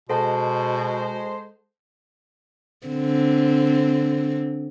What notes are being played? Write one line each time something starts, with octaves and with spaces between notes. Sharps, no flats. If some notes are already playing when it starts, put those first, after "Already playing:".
B2 G#3 A4 C5 F#5 A5
D3 C4